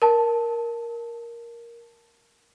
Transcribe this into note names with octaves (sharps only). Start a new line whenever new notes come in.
A#4 A5